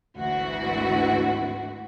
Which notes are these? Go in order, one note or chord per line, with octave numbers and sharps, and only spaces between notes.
G#1 D2 E3 F#4